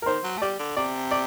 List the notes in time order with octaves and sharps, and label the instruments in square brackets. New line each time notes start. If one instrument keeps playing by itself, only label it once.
[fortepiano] A#4
[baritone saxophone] D#3 [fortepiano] C5
[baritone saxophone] F#3
A3
[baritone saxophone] G3 [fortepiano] D5
[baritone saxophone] D3
[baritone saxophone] C3 [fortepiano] D5
[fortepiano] D5